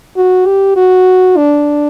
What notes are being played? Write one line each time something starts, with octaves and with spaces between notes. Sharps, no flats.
F#4
G4
F#4
D4